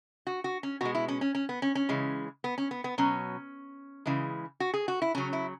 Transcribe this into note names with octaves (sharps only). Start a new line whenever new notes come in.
F#4
F#4
C#4
B2 G#3 F#4
E4
C#4
C#4
C#4
B3
C#4
C#4
C#3 E3 G#3
B3
C#4
B3
B3
B2 F#3 C#4
C#3 E3 G#3
F#4
G#4
F#4
E4
C#3 F#3 C#4
E4